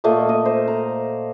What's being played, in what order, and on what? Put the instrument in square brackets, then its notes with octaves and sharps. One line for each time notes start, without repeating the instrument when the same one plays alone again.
[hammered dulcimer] A#2 A3 D#5 C#6
D#5
C5
A#5